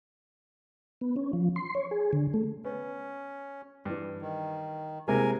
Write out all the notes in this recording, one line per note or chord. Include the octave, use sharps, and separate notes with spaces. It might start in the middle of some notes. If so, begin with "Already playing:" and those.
B3
C#4
F3
C6
C#5
G#4
D3
A3
B3 C#4
G2 E3
D#3
C3 G#3 A#3 E4 G4 A#4 G#5